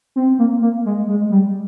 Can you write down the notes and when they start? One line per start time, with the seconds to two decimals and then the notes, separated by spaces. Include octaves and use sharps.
0.16 C4
0.39 A#3
0.62 A#3
0.86 G#3
1.08 G#3
1.31 G3